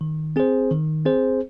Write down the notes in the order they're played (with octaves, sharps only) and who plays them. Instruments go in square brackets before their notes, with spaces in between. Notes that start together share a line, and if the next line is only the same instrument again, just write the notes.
[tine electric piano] D#3
C4 G#4 C5
D#3
C4 G#4 C5